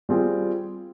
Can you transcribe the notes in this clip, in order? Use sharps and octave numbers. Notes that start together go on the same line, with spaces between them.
G3 C4 F4 G#4